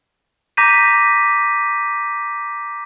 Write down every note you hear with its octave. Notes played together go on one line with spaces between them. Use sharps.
A#5 D6 G6 A#6 B6 D#7